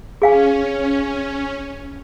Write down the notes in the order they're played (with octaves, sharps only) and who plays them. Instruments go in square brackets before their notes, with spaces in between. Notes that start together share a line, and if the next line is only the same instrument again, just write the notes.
[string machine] C#4 [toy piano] G#4 F5 G#5